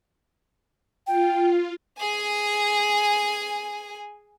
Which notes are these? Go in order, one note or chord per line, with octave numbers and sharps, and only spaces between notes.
F4 G5
G#4 G#5